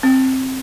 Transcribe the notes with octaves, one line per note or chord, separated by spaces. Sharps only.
C4